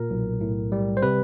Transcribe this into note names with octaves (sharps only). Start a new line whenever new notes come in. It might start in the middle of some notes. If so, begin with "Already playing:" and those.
Already playing: A#2 A#4
B1
A2
G3
C5
C3 B4